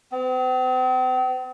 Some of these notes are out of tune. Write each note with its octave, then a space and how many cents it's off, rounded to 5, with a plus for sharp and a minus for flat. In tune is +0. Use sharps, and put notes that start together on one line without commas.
C4 -45